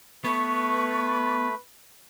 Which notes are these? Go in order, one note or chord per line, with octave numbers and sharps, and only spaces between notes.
A3 B3 B4 B5 C#6